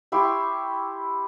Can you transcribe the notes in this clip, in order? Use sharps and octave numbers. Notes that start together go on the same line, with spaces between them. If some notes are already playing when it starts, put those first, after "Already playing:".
E4 G4 C6 C#6